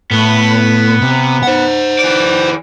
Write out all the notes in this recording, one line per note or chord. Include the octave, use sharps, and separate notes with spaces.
A2 B3
C3
C5 F#5
E3 D5